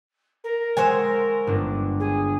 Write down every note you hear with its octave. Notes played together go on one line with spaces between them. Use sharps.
A#4
G#3 C5 C#5 F#5 G#5 E6
G1 D4
G#4